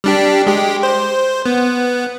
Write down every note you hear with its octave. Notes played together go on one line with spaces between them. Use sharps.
G3 D4 G4
G#3 G4
C5
B3